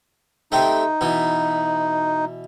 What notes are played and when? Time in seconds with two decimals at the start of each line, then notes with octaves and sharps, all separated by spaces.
0.52 A3 C4 D#4 G4
1.01 B2 E3